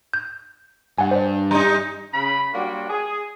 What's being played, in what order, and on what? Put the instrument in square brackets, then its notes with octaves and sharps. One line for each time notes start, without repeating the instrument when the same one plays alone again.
[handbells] G6
[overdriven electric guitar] G2 [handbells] F#5 G#5
[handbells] C5 D5
[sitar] G3 D#4 [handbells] A#5
[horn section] C#3 B5
F#3 G3 A#3 D4 F4 F#4
G#4